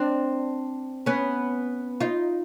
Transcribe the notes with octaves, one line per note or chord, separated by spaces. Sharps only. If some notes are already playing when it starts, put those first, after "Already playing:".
Already playing: C4 D4
B3 C#4
D#4 F4